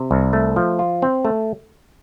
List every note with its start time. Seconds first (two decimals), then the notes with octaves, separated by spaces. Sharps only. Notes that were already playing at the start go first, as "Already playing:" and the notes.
Already playing: C3
0.11 C2
0.33 A3
0.56 F3
0.79 F4
1.02 C4
1.25 A3